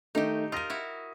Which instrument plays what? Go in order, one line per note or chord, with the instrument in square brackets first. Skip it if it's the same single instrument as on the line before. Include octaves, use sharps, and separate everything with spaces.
[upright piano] D#3 A3 [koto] D#4 G4
[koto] F4 A#4 [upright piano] D#6 A#6 D#7
[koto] E4 F#4